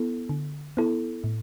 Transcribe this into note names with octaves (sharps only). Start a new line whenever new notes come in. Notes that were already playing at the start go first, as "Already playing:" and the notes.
Already playing: B3 E4 A4
D3
B3 E4 A4
A2